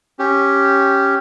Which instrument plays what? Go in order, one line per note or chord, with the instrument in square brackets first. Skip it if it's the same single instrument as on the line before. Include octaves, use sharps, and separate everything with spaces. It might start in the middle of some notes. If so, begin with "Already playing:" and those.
[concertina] C#4 G4